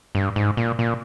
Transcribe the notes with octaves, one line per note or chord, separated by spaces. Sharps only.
G2
G#2
A#2
A#2